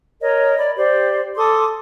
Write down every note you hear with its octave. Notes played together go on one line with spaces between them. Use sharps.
A#4 C#5 D#5
D5 B5
G4 C5 D5
A4 C6 D6 D#6